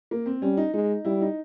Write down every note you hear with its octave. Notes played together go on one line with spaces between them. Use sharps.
A#3
C4
G3 C#4
D#4
G#3 D#4
G3 E4
D#4